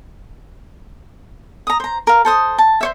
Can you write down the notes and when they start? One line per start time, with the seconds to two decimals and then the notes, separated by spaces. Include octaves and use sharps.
1.67 A#5 D#6
1.80 C5 A#5
2.07 A#4 F5
2.25 A4 C5 D#6
2.58 A5
2.81 C5 C#5 E5